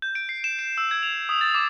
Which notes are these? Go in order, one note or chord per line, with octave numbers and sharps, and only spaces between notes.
G6
D7
C7
E7
D7
E6
G#6
F7
D#6
A6
D6